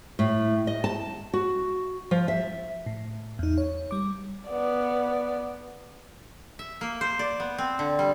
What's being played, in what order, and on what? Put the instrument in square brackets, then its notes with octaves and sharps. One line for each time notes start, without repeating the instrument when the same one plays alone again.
[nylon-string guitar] A2
D#5
A5
F#4
F3
E5
[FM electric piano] A2
E2 D#4
C#5
G3 D6
[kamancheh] B3 D5
[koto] E5
A#3
C5
D5
B3
C4
D3
G3